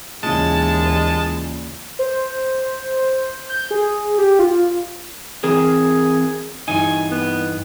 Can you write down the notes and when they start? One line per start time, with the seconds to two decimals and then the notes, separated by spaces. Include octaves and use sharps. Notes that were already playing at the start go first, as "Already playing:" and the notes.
0.23 D#2 A#2 C#3 E3 G#3 A5
1.99 C5
3.49 G6
3.71 G#4
4.18 G4
4.39 F4
5.44 E3 C4 G#4 A#4
6.68 G2 E3 D#4 G#5
7.11 B3